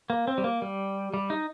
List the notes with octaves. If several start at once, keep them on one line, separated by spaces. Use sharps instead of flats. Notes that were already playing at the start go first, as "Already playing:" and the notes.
A#3
C4
G3
A#3
G3
G3
D#4